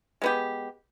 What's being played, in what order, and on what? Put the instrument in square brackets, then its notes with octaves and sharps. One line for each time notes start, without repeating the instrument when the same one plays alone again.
[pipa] G#3 B3 G4